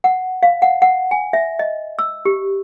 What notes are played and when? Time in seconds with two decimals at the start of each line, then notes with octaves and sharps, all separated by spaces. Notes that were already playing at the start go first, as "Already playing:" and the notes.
0.04 F#5
0.43 F5
0.62 F#5
0.82 F#5
1.11 G#5
1.33 E5
1.59 D#5
1.99 E6
2.25 G4